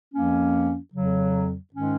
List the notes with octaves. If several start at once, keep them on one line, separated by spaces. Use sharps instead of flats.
F2 F3 A#3 C#4
F2 C#3 F#3
G#2 D#3 G#3 C#4